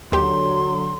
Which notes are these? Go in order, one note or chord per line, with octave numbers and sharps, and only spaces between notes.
D#2 D3 F#3 G4 C6